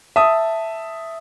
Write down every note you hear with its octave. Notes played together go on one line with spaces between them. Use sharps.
E5 A5 D#6